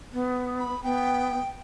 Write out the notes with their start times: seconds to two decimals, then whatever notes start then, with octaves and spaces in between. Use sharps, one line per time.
0.13 B3
0.59 B5
0.83 B3 G5